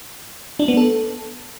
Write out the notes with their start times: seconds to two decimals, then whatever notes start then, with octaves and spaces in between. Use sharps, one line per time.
0.59 D4
0.68 B3
0.77 A4